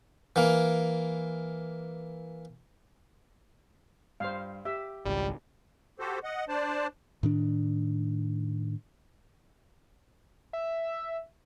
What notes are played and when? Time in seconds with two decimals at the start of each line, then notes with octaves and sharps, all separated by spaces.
0.36 E3 A#3
4.20 G2 C5 F5
4.65 G4 E5
5.06 G#1 C#2 G3
5.99 F#4 G4 A4 C5
6.24 D#5 F#5
6.48 D4 C5 D5 A5
7.23 A2 D#3 D4
10.53 E5